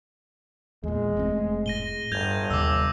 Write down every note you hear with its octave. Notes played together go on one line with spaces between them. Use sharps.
E2 A#2 G#3
F1 A3 C4
A2 A#6 D#7 G7
G1 G2 G6 G#6 F7
D#2 C3 G3 D6 E6